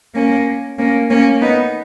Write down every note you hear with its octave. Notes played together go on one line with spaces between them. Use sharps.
A#3 C#4
A#3 C#4
A#3 C#4
B3 D#4